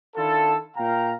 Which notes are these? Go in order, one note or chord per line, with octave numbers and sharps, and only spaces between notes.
D#3 D4 E4 F4 A4
A#2 F5 G5 A#5